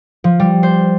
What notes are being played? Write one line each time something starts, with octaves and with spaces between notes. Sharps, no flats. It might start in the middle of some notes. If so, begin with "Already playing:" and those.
F3
G3
C5